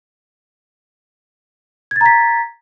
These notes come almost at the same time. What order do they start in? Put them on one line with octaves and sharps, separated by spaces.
G#6 A6 A#5 B6